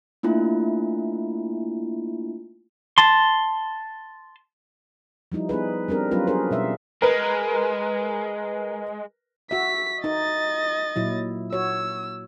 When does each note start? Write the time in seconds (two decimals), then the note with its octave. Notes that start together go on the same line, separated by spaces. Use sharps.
0.23 A3 A#3 D4 E4 F4
2.98 A5 C6
5.32 F3 G3 D#4 E4
5.49 B3 D#4 G#4 B4
5.88 G3 C4 D4 A#4
6.11 F#3 G3 B3 C#4 F4 B4
6.27 D4 G#4 A#4 C5
6.51 B2 G3 E5 F5
7.02 G#3 A#4 B4
9.51 F#4 E5 B6
10.04 D#4 D#5 A6
10.96 A#2 F#3 E4
11.53 F#4 C#5 E6